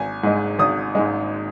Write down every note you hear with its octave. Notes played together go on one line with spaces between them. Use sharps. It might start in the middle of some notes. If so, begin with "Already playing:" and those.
Already playing: G#1 G#5
G#2 G#3
G#1 D#6
G#2 G#3